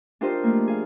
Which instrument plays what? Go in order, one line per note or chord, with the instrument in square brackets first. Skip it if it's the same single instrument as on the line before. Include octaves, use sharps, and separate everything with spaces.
[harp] D4 F4 G4 A#4 C5 D#5
F3 A3 A#3
G#4 F5